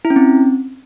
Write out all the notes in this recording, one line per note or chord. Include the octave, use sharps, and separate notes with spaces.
E4
C#4
C4